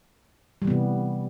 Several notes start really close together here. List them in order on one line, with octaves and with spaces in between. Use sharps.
G3 E3 B3 C3